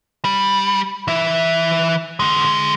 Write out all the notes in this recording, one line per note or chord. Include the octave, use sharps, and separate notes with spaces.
G3
E3 E5
D3 G#3